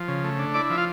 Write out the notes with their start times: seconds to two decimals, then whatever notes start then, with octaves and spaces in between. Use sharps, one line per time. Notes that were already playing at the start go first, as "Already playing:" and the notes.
Already playing: F3
0.08 C#3
0.24 A3
0.39 D4
0.54 E4 D5 D6
0.70 F3 E5
0.78 F4 F5